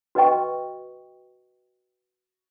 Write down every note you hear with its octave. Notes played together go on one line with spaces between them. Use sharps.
F#4 B4 D#5 G5 C#6